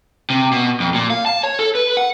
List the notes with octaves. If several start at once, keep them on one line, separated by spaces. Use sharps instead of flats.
C3
B2
F2
A#2
F5
A5
C#5
A4
B4
F#5